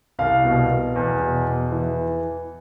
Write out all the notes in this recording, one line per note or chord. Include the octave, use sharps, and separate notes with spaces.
C2 F5
B2
B2
E2
B2
E2
E3